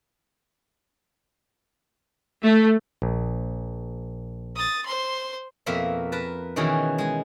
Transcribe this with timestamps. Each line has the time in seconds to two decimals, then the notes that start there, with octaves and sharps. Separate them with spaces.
2.43 A3
3.02 A#1
4.56 D#6 A6
4.86 C5 C6
5.66 F2 B2 A#3 A#4 E5 C6
6.12 A#4 B4 A5
6.56 B2 D#3 E3 C#4 F#4 G#4
6.98 G#3 G#5